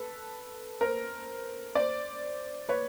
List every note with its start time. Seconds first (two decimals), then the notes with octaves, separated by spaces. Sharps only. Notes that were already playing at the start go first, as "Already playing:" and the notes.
Already playing: A4 B4
0.81 A#4 C5
1.75 C5 D5
2.69 B4 C#5